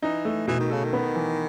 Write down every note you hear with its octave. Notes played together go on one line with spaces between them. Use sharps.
E3 D#4
A3
B2 E3
D#3
C#3 A4
D#3
B3
E3